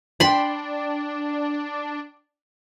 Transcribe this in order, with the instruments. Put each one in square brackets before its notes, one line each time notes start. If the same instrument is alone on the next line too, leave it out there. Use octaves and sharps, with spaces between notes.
[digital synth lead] D4 [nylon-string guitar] D5 G5 [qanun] B5 C6